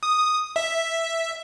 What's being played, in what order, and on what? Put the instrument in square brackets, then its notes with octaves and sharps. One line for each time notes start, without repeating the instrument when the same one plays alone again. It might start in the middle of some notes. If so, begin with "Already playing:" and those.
[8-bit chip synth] D#6
E5